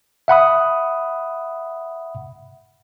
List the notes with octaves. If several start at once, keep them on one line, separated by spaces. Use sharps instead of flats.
E5 F#5 B5 D#6